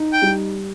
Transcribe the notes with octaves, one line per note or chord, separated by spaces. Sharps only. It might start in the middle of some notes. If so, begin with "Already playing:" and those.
Already playing: D#4
G5
G3